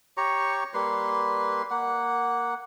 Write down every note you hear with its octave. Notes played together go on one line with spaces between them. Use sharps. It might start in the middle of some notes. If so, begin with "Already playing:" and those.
G4 C#5 A#5 C#6
G3 A#3 B4 C6
A#3 F#5